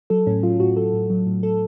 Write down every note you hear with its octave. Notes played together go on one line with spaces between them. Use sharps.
F#3 A4
A2 C#4
F#3 F4
A2 F#4
F#3 A4
A2
F#3
A2
A4